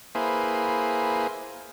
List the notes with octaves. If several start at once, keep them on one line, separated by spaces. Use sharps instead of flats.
A#3 E4 G#4 B4 C5